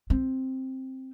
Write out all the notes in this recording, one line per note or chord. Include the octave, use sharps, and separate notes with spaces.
C4